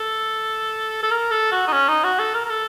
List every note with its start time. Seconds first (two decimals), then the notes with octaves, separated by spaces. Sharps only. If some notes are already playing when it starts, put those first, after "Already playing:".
Already playing: A4
1.03 A4
1.11 A#4
1.31 A4
1.52 F#4
1.67 D#4
1.72 C#4
1.88 D#4
2.04 F#4
2.19 A4
2.34 A#4
2.45 A#4
2.49 A4